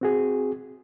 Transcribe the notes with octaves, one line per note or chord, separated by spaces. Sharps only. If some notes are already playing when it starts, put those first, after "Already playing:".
C4 F#4 G#4